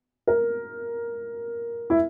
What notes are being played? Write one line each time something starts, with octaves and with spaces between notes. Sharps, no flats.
A#4
E4